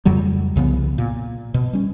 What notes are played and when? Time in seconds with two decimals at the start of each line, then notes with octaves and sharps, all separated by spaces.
0.05 F2 C#3 F#3 G3
0.56 C2 C#3 F3 B3
0.98 A#2
1.54 B2
1.73 G3 C#4